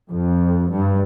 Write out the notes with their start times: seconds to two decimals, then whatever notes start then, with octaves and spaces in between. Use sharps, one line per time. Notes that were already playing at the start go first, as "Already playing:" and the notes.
0.11 F2
0.72 G2